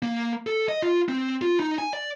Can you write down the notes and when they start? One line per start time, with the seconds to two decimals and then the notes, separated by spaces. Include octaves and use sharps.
0.02 A#3
0.47 A4
0.69 D#5
0.82 F4
1.09 C4
1.42 F4
1.60 D#4
1.78 G#5
1.93 D5